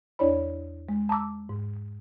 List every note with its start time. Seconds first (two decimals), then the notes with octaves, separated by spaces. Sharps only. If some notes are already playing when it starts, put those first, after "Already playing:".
0.19 E2 D4 E4 C#5 D5 B5
0.89 G#3
1.09 A5 A#5 D6 E6
1.49 G#2